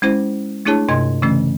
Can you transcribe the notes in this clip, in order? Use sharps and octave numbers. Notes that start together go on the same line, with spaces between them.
G#3 C#4 E4 C5
A3 D4 E4 G#4 C#5 A5
G2 C3 D#5 C6 G#6
C#3 E3 A3 C#4